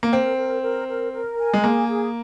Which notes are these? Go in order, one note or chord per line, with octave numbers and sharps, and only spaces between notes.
A#3
C4 A#4
A#4
A#4
A#4
A#4
G#5
G#3
A#3 G#4
G#4